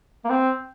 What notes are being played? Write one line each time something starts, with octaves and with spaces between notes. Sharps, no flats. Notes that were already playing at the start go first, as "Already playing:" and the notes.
A#3
C4